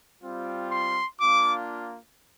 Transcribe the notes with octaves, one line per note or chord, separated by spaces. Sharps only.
G3 C4 F4
C6
A#3 D4 F4 D6